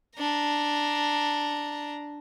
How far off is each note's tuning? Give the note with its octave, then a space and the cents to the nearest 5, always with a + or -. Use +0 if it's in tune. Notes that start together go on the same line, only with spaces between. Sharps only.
D4 +0 A#5 +0